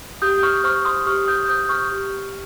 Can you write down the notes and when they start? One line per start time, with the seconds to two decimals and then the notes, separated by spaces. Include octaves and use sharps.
0.22 G4 D#6 G6
0.43 C#6 F6
0.64 C5 C#6 F6
0.85 C6 D#6
1.06 G4 C#6 F6
1.27 D#6 G6
1.48 C5 D#6 G6
1.69 C#6 F6
1.91 G4